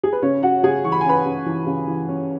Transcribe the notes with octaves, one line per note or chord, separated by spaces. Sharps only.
G#4
B4
C#3 C#4 C#5
C#4 F#4 F#5
C#3 G#4 G#5
E3 C#6
B5
G#5
C#4 B4 B5
C#3
E3
C#3
E3
C#4